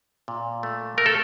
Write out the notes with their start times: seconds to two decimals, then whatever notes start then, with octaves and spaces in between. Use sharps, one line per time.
0.28 A#2
0.63 A3
0.98 A3 A#4
1.06 A4